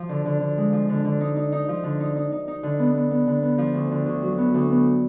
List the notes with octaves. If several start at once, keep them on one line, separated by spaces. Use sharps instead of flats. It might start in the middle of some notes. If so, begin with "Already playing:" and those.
Already playing: F3
D3
D3
D3
G#3
F3
D3
D3
D#4
D#4
D#4
F3
D3
D#4
D#4
D#4
D#4
D3
B3
B3
B3
D3
B3
F3
D2
D3
D2
F#3
B3
D2
B3